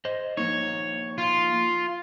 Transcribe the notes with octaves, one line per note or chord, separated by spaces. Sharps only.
C5 D#5
F3 A#3 D#4 C#5
F4